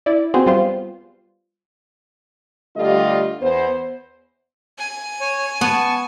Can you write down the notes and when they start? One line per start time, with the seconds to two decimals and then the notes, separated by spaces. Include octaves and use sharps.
0.06 E4 D5
0.34 B3 C4 F#4 G#4 C5
0.46 G3 B3 F4 C5
2.76 D3 G3 A3 F4 G4 D#5
3.41 E2 B3 C5
4.78 G#5
5.21 C#5
5.61 B3 A5 C#6